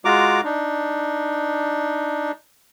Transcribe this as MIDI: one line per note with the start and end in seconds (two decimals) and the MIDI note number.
0.05 0.41 56
0.05 0.41 65
0.05 0.41 66
0.05 0.41 82
0.05 0.41 86
0.45 2.32 62
0.45 2.32 63